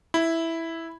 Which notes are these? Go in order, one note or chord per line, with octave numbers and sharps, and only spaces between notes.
E4